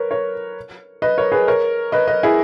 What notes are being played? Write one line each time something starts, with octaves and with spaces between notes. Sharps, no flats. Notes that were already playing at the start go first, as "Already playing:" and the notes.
Already playing: A#4 B4 C#5
A#4 C#5
B4 D#5
A#4 C#5
G#4 B4
A#4 C#5
B4 D#5
B4 D#5
E4 G#4